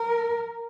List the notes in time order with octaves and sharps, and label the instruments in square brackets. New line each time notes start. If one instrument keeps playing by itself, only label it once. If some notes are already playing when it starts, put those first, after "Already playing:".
Already playing: [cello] A#4